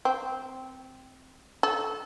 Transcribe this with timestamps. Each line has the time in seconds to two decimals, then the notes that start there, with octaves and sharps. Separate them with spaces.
0.05 C4
1.63 A4